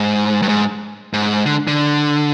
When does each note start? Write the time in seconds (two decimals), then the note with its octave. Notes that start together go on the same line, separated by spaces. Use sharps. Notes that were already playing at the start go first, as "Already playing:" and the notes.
Already playing: G#2
0.42 G2
0.49 G#2
1.13 G#2
1.46 D3
1.67 D3